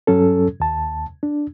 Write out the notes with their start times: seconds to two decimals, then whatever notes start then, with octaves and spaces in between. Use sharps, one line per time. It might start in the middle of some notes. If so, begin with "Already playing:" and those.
0.07 G2 F#3 C#4 A4
0.60 D#2 A5
1.23 D4